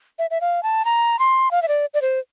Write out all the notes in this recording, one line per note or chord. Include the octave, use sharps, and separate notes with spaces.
E5
E5
F5
A5
A#5
C6
F5
E5
D5
D5
C5